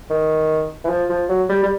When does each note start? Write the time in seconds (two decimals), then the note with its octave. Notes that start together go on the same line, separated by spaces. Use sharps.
0.10 D#3
0.85 E3
0.89 F3
1.09 F3
1.29 F#3
1.49 G3
1.63 G3